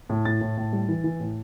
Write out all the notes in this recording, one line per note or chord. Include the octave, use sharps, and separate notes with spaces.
A2
A2 A6
A2
A2
G3
E3
E3
A2